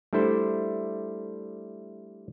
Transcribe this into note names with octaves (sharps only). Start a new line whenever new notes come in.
G3 A3 D4 E4 A4 C5